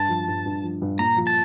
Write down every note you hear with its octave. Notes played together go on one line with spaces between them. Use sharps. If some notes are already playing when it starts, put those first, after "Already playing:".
Already playing: G2 A5
F3
G2
G2
F3
G2
A#2 A#5
F3
A5